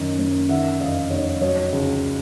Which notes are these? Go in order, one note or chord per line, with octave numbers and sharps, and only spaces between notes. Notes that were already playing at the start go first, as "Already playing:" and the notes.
Already playing: F#2 D#3 D#5
F#2
D#3 E5 F#5
F1 D#5 F5
F1 C#5 D#5
F#3 C#5 D#5
C#2